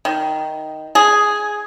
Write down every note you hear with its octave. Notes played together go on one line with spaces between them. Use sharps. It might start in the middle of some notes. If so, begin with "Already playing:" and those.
D#3
G#4